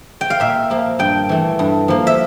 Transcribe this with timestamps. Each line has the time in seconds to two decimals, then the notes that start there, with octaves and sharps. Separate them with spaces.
0.21 G5
0.30 F5
0.40 A#2 E5
0.70 F3 A#3
0.99 G2 G5
1.29 E3 A3
1.59 G2
1.88 F3 A#3
2.07 E5